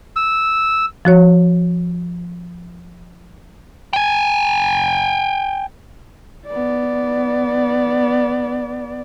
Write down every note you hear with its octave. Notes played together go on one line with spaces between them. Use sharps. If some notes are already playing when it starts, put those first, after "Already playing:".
E6
F3 F#4 C#5
G5 G#5
B3 D5